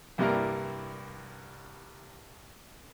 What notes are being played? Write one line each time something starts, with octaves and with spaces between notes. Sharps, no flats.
C2 G2 G3 A#3 E4 A#4